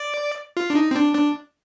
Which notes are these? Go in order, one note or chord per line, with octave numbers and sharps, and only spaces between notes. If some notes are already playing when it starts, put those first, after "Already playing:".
Already playing: D5
F4
D4
D#4
C4
D4
D4